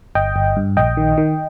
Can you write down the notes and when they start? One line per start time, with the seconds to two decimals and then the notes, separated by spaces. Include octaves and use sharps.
0.15 G1 D#5 G5
0.36 G1
0.56 G2
0.77 A#1 D#5 G5
0.97 D#3
1.18 D#3